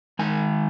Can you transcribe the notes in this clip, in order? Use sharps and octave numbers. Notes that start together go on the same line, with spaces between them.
D#3 G#3 D#4 G#5